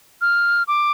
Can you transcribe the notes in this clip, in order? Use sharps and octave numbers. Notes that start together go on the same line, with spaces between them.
F6
D6